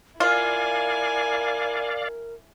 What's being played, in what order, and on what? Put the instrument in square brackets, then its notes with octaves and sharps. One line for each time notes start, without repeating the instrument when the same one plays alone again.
[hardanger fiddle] E4 G#5 [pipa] F4 [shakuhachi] A#4 [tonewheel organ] D5 F5